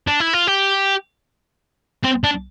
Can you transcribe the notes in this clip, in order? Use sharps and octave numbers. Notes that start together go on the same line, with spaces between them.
D4
E4
F4
G4
C4
D4